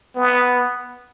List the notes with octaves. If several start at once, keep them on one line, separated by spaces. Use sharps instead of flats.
B3